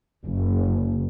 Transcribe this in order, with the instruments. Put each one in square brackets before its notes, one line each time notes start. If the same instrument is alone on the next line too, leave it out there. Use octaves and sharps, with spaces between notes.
[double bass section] F#1